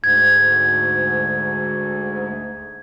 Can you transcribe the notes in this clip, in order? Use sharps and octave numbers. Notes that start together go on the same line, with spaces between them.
D2 G#2 G#6